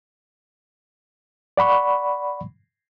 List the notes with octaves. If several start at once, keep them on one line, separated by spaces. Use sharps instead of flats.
D5 F#5 B5 C#6